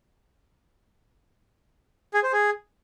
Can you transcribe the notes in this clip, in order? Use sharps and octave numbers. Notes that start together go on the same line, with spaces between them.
G#4
C5
G#4